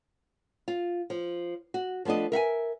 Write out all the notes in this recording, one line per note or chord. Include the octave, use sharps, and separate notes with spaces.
F4
F3
F#4
F3 A3 B3 D4 D#5
A#4 E5 F#5 G#5